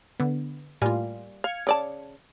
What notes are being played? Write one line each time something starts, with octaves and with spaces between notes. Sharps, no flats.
D3 B3
A2 G3 A#3 F4 G#5
F5 F6 G#6 C#7
C#3 D5 A5